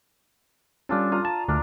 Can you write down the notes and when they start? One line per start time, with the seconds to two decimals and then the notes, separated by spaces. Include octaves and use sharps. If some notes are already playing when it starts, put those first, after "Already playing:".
0.89 G3 C#4 D4 F4 A4
1.12 F4 A#5 D#6
1.25 A5
1.48 D2 D4 A#4